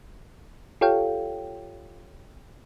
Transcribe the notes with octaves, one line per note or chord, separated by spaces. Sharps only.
F4 G4 A4 C#5 F5 G5